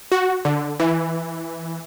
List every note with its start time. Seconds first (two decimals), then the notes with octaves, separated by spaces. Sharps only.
0.12 F#4
0.45 D3
0.80 E3